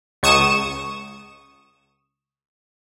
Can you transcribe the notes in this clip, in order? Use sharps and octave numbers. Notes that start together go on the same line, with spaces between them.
C#2 C#6 D#6 E7